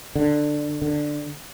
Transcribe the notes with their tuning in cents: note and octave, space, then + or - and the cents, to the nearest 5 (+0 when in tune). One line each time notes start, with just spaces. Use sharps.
D3 +15
D3 +10